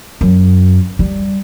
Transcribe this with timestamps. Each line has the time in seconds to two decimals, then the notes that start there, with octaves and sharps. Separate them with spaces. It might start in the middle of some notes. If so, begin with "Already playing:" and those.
0.21 F#2
0.99 G3